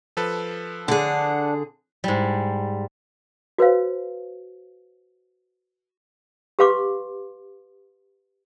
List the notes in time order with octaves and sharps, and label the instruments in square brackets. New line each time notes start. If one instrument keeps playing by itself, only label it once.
[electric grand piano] F3 A4 B4
[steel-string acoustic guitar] D3 G#4 [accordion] D4 [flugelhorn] F#5
[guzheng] G#2 G3
[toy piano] F#4 B4 C5 F5
G4 B4 F5 C6 D6